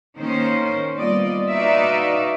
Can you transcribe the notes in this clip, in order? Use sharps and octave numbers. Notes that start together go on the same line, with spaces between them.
D#3 A#3 C#4 C5
G3 A#3 B3 F4 D5 D#5
D#4 F#4 B4 D5 E5 F5